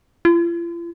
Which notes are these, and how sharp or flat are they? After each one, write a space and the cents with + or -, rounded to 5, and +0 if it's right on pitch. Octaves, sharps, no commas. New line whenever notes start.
F4 -45